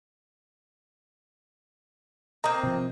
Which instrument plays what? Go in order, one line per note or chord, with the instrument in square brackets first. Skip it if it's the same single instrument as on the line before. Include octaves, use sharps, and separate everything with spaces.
[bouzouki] A#3 C4 [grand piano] D#5 D#6 [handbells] A#5
[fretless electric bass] C3 F3